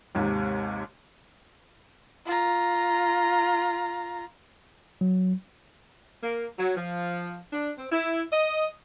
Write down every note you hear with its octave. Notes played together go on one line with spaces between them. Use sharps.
D#2 G#2 C3
F4 A#5
F#3
A#3
F#3
F3
D4
C4
E4
D#5